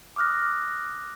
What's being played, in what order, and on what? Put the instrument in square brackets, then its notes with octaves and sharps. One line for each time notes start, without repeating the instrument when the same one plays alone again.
[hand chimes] D6 D#6 F6 F#6 A#6